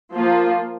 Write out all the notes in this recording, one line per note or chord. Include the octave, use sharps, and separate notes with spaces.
F3 A#3 F4